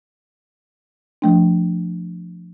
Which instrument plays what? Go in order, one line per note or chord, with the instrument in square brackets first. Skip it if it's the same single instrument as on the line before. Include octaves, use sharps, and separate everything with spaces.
[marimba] F3 A3 D4